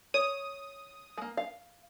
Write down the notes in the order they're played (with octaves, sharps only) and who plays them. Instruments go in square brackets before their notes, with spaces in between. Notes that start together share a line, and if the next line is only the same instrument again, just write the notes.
[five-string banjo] C#5 [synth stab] D#6
[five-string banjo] G#3 A#3
F5